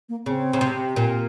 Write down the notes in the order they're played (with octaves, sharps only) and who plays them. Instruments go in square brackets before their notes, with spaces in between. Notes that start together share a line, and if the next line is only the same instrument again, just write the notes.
[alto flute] A#3
[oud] C#3 [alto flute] C4
[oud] C#3
C3
A#2